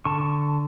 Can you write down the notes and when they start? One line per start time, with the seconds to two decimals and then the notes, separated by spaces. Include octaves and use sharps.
0.05 D3 A5 C#6